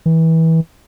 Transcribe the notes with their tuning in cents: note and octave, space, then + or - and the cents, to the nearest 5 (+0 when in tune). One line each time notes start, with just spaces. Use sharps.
E3 -25